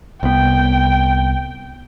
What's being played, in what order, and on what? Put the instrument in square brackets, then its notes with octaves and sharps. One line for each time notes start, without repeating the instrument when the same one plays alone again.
[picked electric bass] C2 B3 [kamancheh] G5